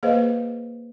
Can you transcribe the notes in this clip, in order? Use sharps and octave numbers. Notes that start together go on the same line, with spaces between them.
A#3 G#4 B4 C5 D#5 F5